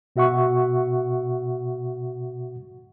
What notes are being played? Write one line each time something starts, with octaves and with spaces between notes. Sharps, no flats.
B2 F#4 E5 F#5 C#6